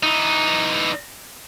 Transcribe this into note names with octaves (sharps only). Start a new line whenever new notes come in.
E3 D#4